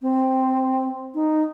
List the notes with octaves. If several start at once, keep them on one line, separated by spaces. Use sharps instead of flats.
C4
D#4